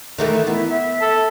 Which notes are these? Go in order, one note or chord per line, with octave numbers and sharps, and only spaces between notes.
D#3 E3 A3
B3 E4
E5
A4